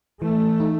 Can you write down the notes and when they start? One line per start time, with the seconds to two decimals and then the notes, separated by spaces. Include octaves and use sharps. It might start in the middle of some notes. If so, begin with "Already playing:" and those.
0.22 E3 A3
0.60 D#4